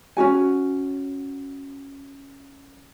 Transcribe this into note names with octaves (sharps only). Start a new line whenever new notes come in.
C#4 D#4 F#4 G#5